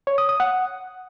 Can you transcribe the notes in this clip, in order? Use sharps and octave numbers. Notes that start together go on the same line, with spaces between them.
C#5
D#6
D#6
F#5